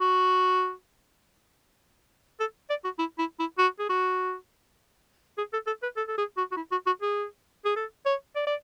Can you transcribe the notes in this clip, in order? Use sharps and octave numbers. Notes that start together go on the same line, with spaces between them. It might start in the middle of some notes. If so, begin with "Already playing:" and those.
F#4
A4
D5
F#4
E4
E4
E4
F#4
G#4
F#4
G#4
A4
A4
B4
A4
A4
G#4
F#4
F#4
E4
F#4
F#4
G#4
G#4
A4
C#5
D5
D5